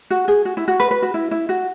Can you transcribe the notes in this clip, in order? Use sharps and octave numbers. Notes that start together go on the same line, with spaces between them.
F#4
G#4
F#4
E4
F#4
B4
B4
F#4
E4
E4
F#4